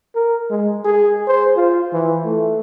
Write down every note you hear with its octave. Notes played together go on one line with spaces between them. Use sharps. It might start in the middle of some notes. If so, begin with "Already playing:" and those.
A#4
G#3
G#4
C5
F4
E3
A3